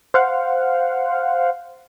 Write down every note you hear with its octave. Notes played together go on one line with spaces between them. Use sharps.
C5 F5 F#5